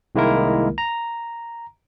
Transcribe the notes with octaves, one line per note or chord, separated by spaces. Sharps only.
C2 D#3 G#3 A#3 E4 A#4
A#5